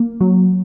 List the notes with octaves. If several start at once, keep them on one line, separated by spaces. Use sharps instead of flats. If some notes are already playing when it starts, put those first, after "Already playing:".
Already playing: A#3
F#3